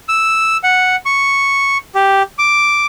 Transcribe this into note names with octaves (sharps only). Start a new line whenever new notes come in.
E6
F#5
C#6
G4
D6